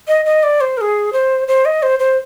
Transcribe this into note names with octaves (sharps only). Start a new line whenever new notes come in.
D#5
D#5
D5
C5
A#4
G#4
C5
C5
D#5
C5
C5